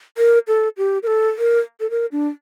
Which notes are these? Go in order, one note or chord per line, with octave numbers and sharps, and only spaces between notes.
A#4
A4
G4
A#4
A4
A#4
A4
A#4
D4